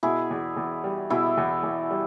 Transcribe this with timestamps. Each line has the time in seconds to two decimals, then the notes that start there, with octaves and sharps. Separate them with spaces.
0.03 B2 E4 G#4
0.30 E2
0.57 E2
0.84 G3
1.10 B2 E4 G#4
1.37 E2
1.63 E2
1.91 G3